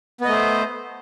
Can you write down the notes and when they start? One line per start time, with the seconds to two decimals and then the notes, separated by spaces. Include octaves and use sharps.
0.21 B3
0.25 D#5
0.28 A3
0.32 C5